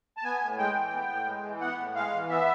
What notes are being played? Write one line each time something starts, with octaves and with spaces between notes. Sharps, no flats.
A5
B3 G#5
A2
G#3 G5
E3
B3
A2
G#3
E3
B3 F#5
A2
G#3 F5
E3
B3 E5